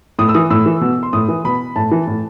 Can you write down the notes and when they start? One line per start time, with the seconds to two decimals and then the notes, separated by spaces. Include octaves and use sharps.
0.19 A2 D#6
0.29 E6
0.34 E3 D#6
0.50 A2 E6
0.66 E3
0.81 B2
1.03 C6
1.13 A2 D#6
1.28 E3
1.45 B2 B5
1.76 A2 A5
1.91 E3
2.07 A2